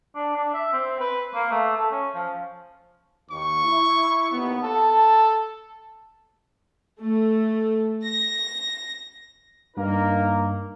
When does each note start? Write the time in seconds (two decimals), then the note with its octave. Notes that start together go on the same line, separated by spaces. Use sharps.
0.15 D4
0.36 D4
0.54 E5
0.73 C4
1.00 B4
1.34 A#3
1.51 A3
1.76 A4
1.91 C#4
2.15 F3
3.30 D#2 C#6
3.66 E4
4.32 D#2 B3
4.64 A4 A5
7.00 A3
8.03 A#6
9.77 G2 A#3 D#4 A#4